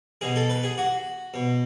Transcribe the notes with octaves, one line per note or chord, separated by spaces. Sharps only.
B2 G#4
A4
B4
G#4
F#4
B2